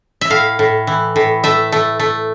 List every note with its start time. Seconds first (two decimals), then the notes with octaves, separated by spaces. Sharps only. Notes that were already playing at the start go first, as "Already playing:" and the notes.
0.21 E5
0.30 A2 F5
0.59 A2
0.87 E3
1.16 A2
1.44 A3 E5
1.72 A3
1.99 A3